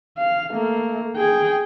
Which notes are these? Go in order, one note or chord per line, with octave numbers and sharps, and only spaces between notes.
F5
A3 A#3
G#4 G5